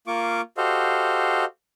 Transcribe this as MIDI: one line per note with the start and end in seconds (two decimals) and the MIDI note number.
0.07 0.41 58
0.07 0.41 65
0.07 0.41 85
0.07 0.41 86
0.57 1.45 66
0.57 1.45 67
0.57 1.45 69
0.57 1.45 72
0.57 1.45 75
0.57 1.45 77